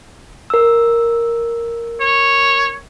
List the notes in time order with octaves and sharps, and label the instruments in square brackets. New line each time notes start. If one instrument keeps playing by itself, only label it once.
[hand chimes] A#4 E6
[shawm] C#5